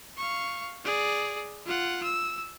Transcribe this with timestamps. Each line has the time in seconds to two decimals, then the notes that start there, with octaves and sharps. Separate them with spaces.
0.17 F5 C#6
0.85 G#4 D5
1.66 F4 F#5
2.03 E6